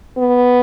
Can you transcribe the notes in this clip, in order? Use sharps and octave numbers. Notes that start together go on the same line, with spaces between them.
B3